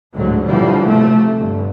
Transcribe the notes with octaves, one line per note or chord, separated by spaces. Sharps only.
A1 D2 G#2 D3 F#3
A2 D3 E3 F3 G3
C3 A3
G1